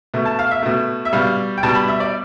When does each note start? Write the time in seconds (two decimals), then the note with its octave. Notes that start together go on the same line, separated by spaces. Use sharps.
0.14 B2 A3
0.25 A5
0.39 F5
0.51 E5
0.63 B2 A3
1.05 E5
1.13 B2 G3 F5
1.58 G5
1.63 B2 G3 A5
1.75 B5
1.88 E5
2.00 D5